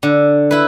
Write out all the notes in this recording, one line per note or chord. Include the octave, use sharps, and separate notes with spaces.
D3
E4 B4